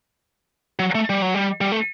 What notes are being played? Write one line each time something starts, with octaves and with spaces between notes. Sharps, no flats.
F#3
A3
G3
F#3
G3
G3
A3